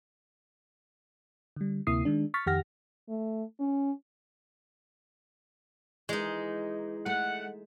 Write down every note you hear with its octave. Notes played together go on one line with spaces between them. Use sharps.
D3 G3
D2 C3 A#3 E4 D#6 C7
D#3 G#3 D4
C#6 F6 A6 B6
F2 D#3 G4 F#5 F6 A#6
A3
C#4
E3 G#3 D#4
A3 F#5